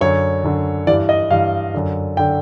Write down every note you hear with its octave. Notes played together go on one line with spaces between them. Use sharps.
F#2 D3 C#5
F#2 D3
G2 E3 D5
D#5
G2 E3 F5
F#2 D3
D3 G5